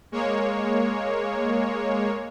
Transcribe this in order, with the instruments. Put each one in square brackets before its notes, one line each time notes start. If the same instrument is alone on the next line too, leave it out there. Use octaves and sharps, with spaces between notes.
[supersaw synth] G#3 A#3 C#5